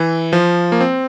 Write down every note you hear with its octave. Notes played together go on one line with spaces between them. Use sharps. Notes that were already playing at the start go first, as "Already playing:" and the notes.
Already playing: E3
F3
A#3
C4